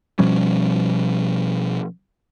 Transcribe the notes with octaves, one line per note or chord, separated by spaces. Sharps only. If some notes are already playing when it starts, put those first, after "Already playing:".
B2 F3 G3 C#4